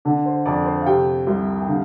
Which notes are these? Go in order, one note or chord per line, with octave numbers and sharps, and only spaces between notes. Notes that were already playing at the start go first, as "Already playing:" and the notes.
D3 D5
C5
F2 D5
C5
F5
C3 G5
C2
G5
D3 F5